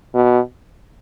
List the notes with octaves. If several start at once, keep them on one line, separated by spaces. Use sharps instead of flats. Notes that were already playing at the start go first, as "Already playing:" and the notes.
B2